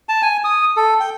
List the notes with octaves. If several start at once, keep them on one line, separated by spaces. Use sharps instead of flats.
A5
G#5
D#6
A4
G5